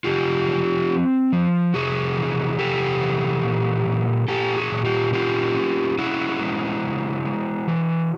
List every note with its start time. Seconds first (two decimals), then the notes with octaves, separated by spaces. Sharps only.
0.04 C#3 F4 G4
0.47 F3
0.89 C4
1.33 F3
1.74 C3 F#4 G#4
2.17 E3
2.59 C3 G4 A4
3.01 E3
3.43 A#2
3.86 A#2
4.28 A#2 G4 A4
4.56 F#4 G#4
4.71 A#2
4.85 F4 G4
5.13 C#4 F4 G4
5.55 C#4
5.98 C#4 E4 F#4
6.40 G#3
6.83 C#3
7.25 G#3
7.68 E3